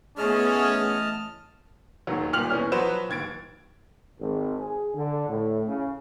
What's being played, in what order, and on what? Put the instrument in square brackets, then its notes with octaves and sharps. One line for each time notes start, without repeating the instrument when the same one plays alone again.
[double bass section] E3 A3 B3 [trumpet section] C#4 [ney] G#4 [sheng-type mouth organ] D#5 A5 F6
[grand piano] E1 D#2 G#2 F#3
D#1 A#2 G5 F6 F7 F#7
B2 E3 C#4 F6
F3 F#3 B4 C5 E7
D1 D#2 G#6 A6 D7
[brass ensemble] G#1
G#4
D3
A2
C#3